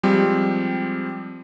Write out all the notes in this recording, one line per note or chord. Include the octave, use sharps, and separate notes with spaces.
F3 G3 G#3 C4 G4